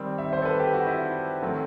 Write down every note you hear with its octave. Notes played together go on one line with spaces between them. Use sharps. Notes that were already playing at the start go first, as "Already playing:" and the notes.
Already playing: D#3 G3 C4
E5
C5
A4
B4
G4
F#4
E4
D#3 F#3 A3 C4